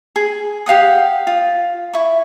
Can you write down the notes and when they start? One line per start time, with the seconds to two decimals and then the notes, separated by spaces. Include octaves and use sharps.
0.16 G#4
0.66 G4 F5 F#5 D#6
1.27 F4
1.93 E4 C#6